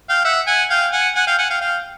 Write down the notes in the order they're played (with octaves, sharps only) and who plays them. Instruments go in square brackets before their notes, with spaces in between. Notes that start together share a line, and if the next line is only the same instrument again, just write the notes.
[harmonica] F5 G5
E5 F#5
F#5 G#5
F5 G5
F#5 G#5
F#5 G#5
F5 G5
F#5 G#5
F5 G5
F5 G5